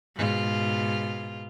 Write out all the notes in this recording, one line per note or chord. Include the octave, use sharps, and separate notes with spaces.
G#2 B2 F4